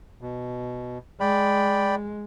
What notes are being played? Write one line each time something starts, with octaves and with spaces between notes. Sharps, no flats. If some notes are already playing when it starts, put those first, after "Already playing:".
B2
G#3 D5 G5 B5